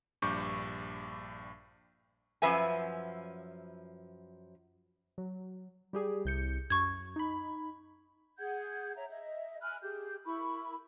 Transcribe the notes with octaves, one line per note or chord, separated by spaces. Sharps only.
A#1 G2 C#6 D6 G6
F#2 F3 B4 E5 G#5
F#3
G3 G4 G#4
C2 G6 C#7
F#2 C#6 G#6
D#4 B5
G#4 F#5 G6 G#6
C#5 E5 A#5
D#5 E5
G#5 B5 F6 F#6
G4 G#4 G6
E4 A#4 B5 C#6